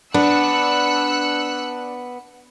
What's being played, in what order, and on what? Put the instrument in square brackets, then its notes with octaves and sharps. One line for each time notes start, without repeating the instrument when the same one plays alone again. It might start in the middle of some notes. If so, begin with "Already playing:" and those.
[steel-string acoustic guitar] B3 [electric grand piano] D4 [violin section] E6 F#6 C#7